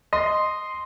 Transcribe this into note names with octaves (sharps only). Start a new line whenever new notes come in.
D#5 C6